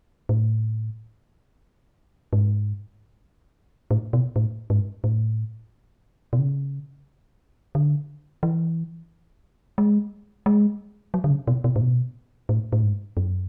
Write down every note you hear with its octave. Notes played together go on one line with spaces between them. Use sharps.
A2
G#2
A2
B2
A2
G#2
A2
B2
C#3
D3
E3
G#3
G#3
F#3
D3
C#3
B2
B2
A2
B2
A2
A2
G#2
F#2